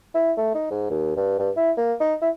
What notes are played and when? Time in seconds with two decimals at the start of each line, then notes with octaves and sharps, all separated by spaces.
0.15 E4
0.37 A3
0.55 D#4
0.71 G#2
0.91 D#2
1.17 G2
1.39 G2
1.57 E4
1.77 A#3
2.00 D#4
2.22 E4